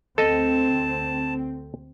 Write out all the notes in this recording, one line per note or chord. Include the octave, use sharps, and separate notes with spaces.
D2 C4 A4 D#5 A5